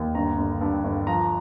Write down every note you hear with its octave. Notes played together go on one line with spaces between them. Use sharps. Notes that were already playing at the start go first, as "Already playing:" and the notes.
Already playing: D#2
G1 A#5
G1
G2
G1
F3 A#5